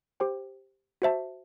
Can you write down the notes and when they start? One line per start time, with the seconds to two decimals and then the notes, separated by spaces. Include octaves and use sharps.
0.20 G4 C5 G5
1.02 F#4 C5 E5 A5